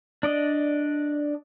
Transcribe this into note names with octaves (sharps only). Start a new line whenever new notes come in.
D4 D5 D#5